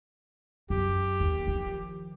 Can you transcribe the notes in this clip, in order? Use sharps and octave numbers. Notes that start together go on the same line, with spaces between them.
F#2 G4
D#2
D#3 F3